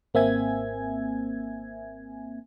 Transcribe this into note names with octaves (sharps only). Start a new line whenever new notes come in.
G#1 A#3 C4 E5 G#5 G#6